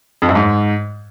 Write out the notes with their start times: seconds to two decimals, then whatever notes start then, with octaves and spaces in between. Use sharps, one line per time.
0.22 F2
0.29 F#2
0.35 G#2